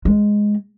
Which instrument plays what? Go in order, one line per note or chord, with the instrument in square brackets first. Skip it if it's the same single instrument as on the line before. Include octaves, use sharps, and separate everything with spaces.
[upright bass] G#3